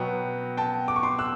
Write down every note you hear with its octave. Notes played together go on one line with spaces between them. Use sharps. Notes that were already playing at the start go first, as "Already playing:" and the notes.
Already playing: B2 F#3 B3 G5
G5 A5
D6
C#6
C6 D6
E6 F#6